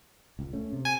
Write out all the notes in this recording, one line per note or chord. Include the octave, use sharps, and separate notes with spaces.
C#2
A3 C#4
C3
G#5